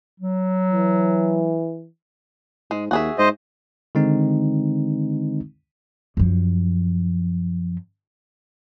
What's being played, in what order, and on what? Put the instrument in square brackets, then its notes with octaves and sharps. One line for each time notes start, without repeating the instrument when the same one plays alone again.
[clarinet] F#3
[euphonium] E3
[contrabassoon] G#2 [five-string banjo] G#3
[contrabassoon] D#2 [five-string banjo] F#4 G#4 E5
[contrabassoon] G#2 [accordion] C5 D#5
[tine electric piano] D3 D#3 G#3 C4 D#4
[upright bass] F#2 F3